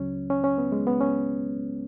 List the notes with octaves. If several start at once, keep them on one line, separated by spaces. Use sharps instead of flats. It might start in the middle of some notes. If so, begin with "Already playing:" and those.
Already playing: C#2 C#3 F#3 C#4
C#4
C#4
B3
G#3
B3
C#4